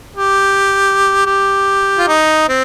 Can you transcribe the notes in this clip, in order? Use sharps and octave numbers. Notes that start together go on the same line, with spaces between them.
G4
G4
F4
D#4
C4